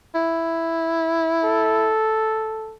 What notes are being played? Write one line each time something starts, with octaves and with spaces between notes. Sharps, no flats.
E4
A4